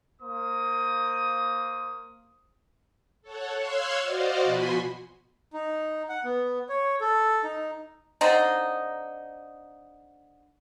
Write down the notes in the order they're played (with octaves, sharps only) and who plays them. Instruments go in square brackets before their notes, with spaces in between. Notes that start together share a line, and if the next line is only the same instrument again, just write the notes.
[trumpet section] A#3 C5 D#6
[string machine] A4 C#5 F#5
C#5 F5 C6 E6 F#6 G#6
F#4 C5 D5 D#5 F5 F#5
B2 F3 F#4 G#5 B5 C6
[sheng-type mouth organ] D#4
F#5
B3
C#5
A4
D#4
[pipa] D3 C4 D#4